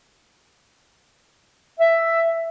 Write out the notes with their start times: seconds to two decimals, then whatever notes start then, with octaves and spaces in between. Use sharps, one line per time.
1.80 E5